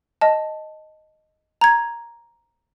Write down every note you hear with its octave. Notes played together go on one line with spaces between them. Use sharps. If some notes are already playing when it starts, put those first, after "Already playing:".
D#5 A5
A#5 G#6